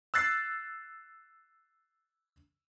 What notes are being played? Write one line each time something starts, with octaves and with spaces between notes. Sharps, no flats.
E6 F#6 A6 C7